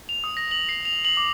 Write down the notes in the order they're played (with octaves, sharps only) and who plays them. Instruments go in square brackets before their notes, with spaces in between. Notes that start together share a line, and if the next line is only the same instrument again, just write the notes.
[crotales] F7
D#6
A#6
F#7
C7
F7
F#7
D6